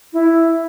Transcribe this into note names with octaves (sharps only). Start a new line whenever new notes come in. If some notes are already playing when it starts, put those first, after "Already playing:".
E4